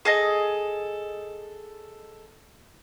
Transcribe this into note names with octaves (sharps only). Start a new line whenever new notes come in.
G#4 A4 D#5